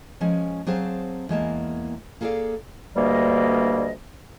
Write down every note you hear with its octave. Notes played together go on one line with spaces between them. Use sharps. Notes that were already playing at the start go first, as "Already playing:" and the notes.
F3 G#3 C#4
F#3 C4 G#4 C5 F5 A5
E2 G#3 A#3 A5
A#3 G#4 A4 C5 D5 F5
D2 G2 G3 A#3 D#5